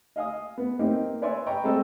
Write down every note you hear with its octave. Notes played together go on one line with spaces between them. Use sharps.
D#5 F5 G#5 D#6
B3
A#3 C4 D#4 G4
B4 C#5 D5 E5 G#5 C6
D#5 G5 A#5 B5 C#6
G#3 C4 A4 D#5 G5